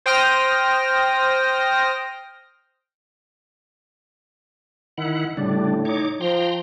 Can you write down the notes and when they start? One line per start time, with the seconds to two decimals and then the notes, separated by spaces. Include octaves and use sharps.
0.06 C5 G5 D#6 F6 A#6
4.98 D#3 E4 F#5
5.37 A2 C#3 G3 D4
5.85 D#4 C#5 D6
6.21 F3 G5 A#5 C6